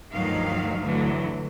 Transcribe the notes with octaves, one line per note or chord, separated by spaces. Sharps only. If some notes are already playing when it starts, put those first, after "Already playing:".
D2 G2 D#3 F3 F#3 F5
D2 D3 E3 F#3